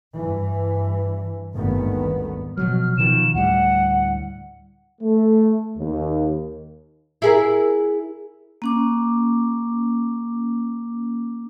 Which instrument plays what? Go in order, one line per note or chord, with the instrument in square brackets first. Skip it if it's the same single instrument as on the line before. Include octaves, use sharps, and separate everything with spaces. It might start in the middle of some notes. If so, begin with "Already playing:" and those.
[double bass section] G2 E3
G#1 D2 G2 D#3 B3
[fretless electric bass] B2 F3 F#3 [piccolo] F6
[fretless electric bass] B2 D#3 F3 [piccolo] E7
[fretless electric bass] D2 A2 G3 [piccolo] F#5
[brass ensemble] A3
D#2
[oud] E4 G#4 A#4
[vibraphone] A#3 C#4 D6